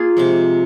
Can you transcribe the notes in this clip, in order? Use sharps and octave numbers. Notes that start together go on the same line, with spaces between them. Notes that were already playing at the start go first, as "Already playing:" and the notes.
Already playing: A#3 F4 G#4
C3 F3 G#3